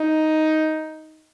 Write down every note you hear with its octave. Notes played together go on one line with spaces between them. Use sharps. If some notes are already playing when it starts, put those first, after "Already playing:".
Already playing: D#4